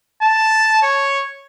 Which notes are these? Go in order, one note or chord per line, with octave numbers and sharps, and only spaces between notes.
A5
C#5